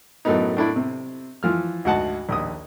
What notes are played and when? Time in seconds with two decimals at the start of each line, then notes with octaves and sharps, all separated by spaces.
0.25 F#2 A2 F#3 A3 B3 D#4
0.57 A2 D4 E4
0.76 C3
1.43 E3 F3 F6
1.85 D2 G#2 F#4 D#5 F#5 A5
2.29 A#1 D#2 D#6